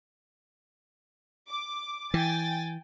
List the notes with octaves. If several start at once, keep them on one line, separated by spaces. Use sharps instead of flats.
D6
E3 G5 G#5 A6